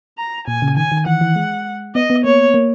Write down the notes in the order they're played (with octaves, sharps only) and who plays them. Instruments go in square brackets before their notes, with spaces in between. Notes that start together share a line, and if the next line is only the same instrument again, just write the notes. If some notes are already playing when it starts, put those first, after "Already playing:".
[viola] A#5
[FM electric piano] A#2 [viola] G#5
[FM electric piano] C#3
[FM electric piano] D#3 [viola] G#5
[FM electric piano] D#3
[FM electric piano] E3 [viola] F#5
[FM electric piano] E3
G#3
[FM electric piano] B3 [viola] D#5
[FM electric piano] B3
[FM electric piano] A#3 [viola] C#5
[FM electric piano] A#3